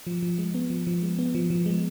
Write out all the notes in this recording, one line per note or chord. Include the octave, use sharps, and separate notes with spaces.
F3
F3
G#3
B3
F3
F3
G#3
B3
F3
F3
G#3